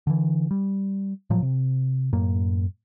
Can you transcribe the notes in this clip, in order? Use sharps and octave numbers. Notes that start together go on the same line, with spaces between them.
D3 E3
G3
A2 F3 F#3
C3
F#2 A2 A#3